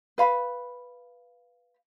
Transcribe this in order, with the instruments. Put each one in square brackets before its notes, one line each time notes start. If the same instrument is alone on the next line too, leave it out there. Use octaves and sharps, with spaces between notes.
[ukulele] B4 F5 B5